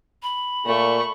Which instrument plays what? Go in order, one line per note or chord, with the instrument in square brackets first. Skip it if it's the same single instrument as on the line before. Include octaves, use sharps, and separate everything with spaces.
[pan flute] B5
[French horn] A#2 [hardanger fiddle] A3 C#6